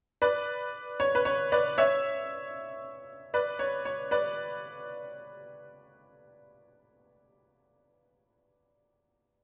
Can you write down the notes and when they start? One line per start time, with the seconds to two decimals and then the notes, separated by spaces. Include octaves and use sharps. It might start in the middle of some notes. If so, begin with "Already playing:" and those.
0.22 B4 D5
1.00 C#5
1.15 B4
1.25 C#5
1.52 B4 D5
1.78 C#5 E5
3.34 B4 D5
3.59 C#5
3.85 C#5
4.11 B4 D5